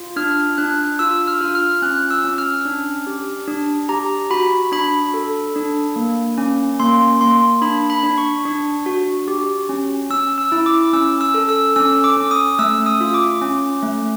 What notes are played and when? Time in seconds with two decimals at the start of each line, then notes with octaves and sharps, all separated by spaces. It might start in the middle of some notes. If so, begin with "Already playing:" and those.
Already playing: F4
0.16 D4 F6
0.58 D4 F#6
0.99 F4 E6
1.28 F6
1.41 F4
1.55 F6
1.82 C#4 F#6
2.10 E6
2.24 C#4
2.38 F6
2.65 D4
3.07 G4
3.47 D4
3.89 G4 A#5
4.31 F#4 B5
4.72 D4 B5
5.14 A4
5.56 D4
5.96 A#3
6.38 C#4
6.80 A#3 C6
7.21 A#3 C6
7.61 D4 B5
7.90 B5
8.03 D4
8.18 C#6
8.45 D4
8.86 F#4
9.28 G4
9.69 C#4
10.10 C#4 E6
10.38 E6
10.52 E4
10.66 D6
10.93 C#4 E6
11.21 E6
11.34 A4
11.49 E6
11.76 C#4 E6
12.04 D6
12.17 C#4
12.31 D#6
12.59 A3 E6
12.86 D#6
13.01 F4
13.14 D6
13.41 C#4
13.83 A3